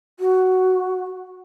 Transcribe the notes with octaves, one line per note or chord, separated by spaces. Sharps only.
F#4